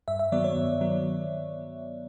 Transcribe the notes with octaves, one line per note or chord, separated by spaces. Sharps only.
G2 E5
E5
D#3 F#3 B3 D5
C#5
G2
D#3 F#3 B3